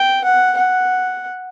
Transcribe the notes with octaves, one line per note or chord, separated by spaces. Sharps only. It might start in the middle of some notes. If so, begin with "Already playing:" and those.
Already playing: G5
F#5
F#5